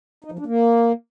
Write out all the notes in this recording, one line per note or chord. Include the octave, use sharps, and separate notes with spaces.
D#4
F3
D4
A#3